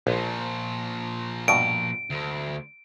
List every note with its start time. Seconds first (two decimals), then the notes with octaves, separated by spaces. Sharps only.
0.07 A#1 A#2 F3
1.48 G2 B2 D7
2.10 D2